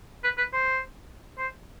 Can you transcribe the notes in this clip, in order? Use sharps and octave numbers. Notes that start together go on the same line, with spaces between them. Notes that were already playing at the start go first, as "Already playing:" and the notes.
B4
B4
C5
C5